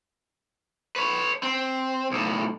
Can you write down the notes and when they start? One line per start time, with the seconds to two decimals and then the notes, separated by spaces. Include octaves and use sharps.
0.96 B4 C#5
1.43 C4
2.11 B1 A2